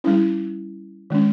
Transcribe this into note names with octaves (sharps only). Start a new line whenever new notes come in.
G3 C#4 E4
D#3 G#3 C#4